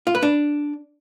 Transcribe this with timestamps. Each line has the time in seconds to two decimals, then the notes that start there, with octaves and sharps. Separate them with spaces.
0.07 F4
0.15 B4
0.23 D4